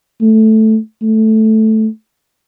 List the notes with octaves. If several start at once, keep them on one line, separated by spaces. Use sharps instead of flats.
A3
A3